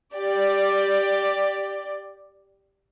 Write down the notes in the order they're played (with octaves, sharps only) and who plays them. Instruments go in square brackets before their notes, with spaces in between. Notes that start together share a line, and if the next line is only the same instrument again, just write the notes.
[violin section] G4 D5